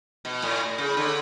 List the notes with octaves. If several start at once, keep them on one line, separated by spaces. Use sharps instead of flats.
B2
A2
C#3
D3